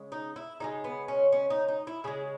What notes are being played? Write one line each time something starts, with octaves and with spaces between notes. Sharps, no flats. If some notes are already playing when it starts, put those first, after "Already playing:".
Already playing: C#3 G#3
D#4
E4
C#3 E3 G#3 D#4
B3
C#4
C#4
D#4
D#4
E4
C#3 G#3 G#4